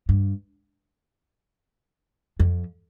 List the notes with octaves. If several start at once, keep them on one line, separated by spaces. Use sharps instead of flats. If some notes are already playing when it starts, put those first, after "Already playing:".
G2
F2